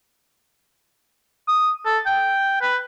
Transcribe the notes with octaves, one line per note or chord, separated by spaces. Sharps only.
D#6
A4
G5
B4